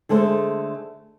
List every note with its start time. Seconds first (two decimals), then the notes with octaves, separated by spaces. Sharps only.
0.09 D3 G#3 A3 A4 C5